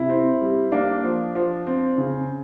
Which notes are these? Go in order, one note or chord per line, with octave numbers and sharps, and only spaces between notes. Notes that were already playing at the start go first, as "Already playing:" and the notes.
Already playing: C3 E4
C4
G3
A#3 D4
F3
F3
C4
C#3